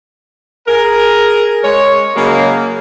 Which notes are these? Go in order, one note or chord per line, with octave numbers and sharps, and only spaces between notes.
G#4 A#4
G#3 C#5
C#3 F#3 G#3 A#3